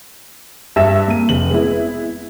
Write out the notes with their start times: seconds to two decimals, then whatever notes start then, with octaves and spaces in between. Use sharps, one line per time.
0.76 G2 E5 E7
1.08 A#3 D#7
1.29 F1 F#7
1.51 G#3 B3 E4